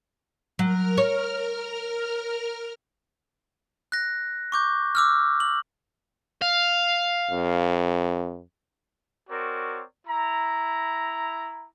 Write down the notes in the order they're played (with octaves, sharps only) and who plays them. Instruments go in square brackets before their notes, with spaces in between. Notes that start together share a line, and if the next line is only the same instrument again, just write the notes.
[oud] F#3 [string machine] A#4 F6
[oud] C#5
[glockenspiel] F#6 A#6
C#6 D6 G6
D6 E6 F6
F#7
[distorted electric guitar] F5
[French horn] F2
[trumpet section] C4 F#4 A#4 C#5 D5
E4 A#5